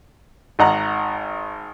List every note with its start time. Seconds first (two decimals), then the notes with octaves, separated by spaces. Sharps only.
0.59 G#1 D#5 F#5 A#5